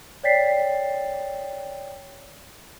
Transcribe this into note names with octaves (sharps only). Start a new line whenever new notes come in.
C#5 D5 G5 A6 B6 C7